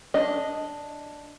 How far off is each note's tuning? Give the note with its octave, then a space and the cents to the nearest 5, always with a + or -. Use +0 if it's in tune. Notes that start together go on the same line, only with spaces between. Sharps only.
D4 +0 D#5 +0